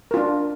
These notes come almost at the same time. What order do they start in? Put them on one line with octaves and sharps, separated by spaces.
A#4 F4 D4